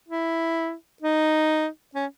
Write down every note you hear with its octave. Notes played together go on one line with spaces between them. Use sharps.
E4
D#4
C#4